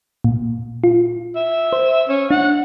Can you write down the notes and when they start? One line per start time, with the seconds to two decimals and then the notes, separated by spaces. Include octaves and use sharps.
0.24 A#2
0.84 F4
1.35 E5
1.73 C5
2.09 C#4
2.31 D4 F#5